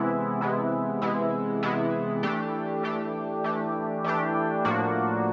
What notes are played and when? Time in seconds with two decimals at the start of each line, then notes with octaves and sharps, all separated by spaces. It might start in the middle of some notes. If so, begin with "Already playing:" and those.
Already playing: C3 E3 G#3 B3 E4
0.41 C3 E3 G#3 B3 E4
1.01 C3 E3 G#3 B3 E4
1.63 C3 E3 G#3 B3 E4
2.23 E3 A3 D4 G4
2.83 E3 A3 D4 G4
3.44 E3 A3 D4 G4
4.04 E3 A3 D4 G4
4.65 A2 F3 A#3 D4 F#4